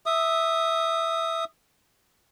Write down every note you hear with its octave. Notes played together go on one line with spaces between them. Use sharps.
E5 D#6